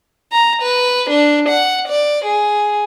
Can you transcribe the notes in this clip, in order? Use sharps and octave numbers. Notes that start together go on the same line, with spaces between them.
A#5
B4
D4
F#5
D5
G#4